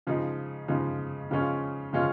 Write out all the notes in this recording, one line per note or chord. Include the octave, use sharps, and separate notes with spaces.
C#3 F3 G#3 D#4
C#3 F3 G#3 D#4
C#3 F3 G#3 C#4 F4
C#3 F3 G#3 C#4 F4